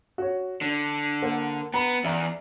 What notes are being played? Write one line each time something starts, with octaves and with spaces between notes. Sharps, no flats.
F#4 C#5
D3 D4
A#3 C5 F#5
B3 A#5 B5
E2 D5 E5 A#5